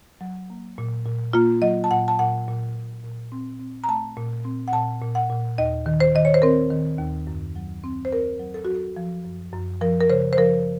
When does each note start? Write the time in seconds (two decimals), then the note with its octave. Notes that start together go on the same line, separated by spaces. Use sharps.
0.21 F#3
0.50 A#3
0.78 A#2
1.06 A#2
1.33 A#3 F4
1.62 F#3 D#5
1.84 A5
1.91 A#2 F#5
2.08 A5
2.19 A#2 F#5
2.48 A#2
2.76 A#2
3.04 A#2
3.32 C4
3.59 C4
3.84 A#5
3.88 A3 A5
4.17 A#2
4.45 C4
4.68 F#5
4.73 A#2 A5
5.02 A#2
5.15 F#5
5.30 A#2
5.58 D#2 D#5
5.86 D#3
6.00 C5
6.15 D#3 D#5
6.25 C#5
6.34 C5
6.42 C4 A#4
6.70 D#3
6.99 D#2
7.27 F#2
7.56 F#3
7.84 C4
8.05 C5
8.11 C4 A#4
8.40 F#3
8.54 A4
8.65 F#3 F#4
8.74 A4
8.97 F3
9.25 F#2
9.53 F#2
9.81 F3 A#4
10.01 A#4
10.10 C#3 C5
10.33 C5
10.37 F3 A#4